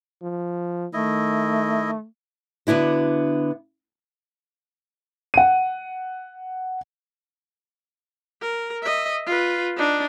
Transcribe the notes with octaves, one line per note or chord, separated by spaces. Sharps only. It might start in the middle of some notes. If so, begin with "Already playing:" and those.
F3
D#3 A3 E4 D#5
D3 B3 D4 E4 F#4
F#5 D#7
A#4
D#5 E5
F4 B4
D4 D#4